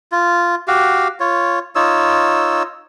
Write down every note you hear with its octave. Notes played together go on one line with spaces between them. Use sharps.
F4
F#4 G4 F5
F4 C#5
D#4 F4 C#5 E6